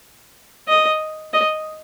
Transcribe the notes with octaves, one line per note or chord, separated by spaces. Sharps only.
D#5
D#5